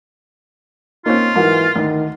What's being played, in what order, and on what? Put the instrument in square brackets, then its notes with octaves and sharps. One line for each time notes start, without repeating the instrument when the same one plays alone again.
[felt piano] A#3 [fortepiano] C4 C#4 D#4 [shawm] F4
[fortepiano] G#2 F#3 [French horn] E3 [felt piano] A#4
[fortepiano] D2 [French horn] D#3